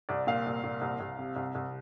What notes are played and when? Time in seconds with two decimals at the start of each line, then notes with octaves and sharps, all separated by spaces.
0.09 C2 D5
0.27 A#2 F5
0.46 C2
0.64 A#2
0.81 C2
1.00 C2
1.19 C3
1.36 C2
1.55 C2